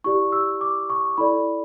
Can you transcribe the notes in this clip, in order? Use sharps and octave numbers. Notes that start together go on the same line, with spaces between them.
E4 G4 D5 C#6
E6
D6
C#6
E4 A4 D5 B5